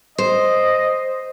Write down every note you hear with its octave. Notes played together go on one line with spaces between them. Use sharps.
C5 D#5